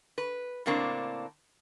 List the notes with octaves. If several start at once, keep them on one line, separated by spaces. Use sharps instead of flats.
B4
A2 C#3 A#3 C4 D4